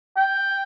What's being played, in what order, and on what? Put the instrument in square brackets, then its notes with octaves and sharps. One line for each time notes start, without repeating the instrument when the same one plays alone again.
[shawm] G5